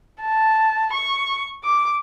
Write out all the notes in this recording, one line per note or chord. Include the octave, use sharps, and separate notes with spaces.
A5
C#6
D6